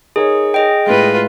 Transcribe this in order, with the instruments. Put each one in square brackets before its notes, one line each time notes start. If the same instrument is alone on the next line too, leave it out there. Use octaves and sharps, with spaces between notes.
[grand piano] D#4 A#4 C#5 [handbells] G#4
[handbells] G#4 D#5 G5
[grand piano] A2 G#3 [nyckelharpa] F4 B4